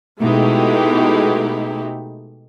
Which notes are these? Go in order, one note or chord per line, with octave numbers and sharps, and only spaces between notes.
B2 G#3 A3 D#4 E4 G4